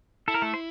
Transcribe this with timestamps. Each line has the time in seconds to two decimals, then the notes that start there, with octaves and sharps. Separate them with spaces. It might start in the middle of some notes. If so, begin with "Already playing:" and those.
0.28 E4 A4
0.34 A#4
0.42 A3 A4
0.54 C5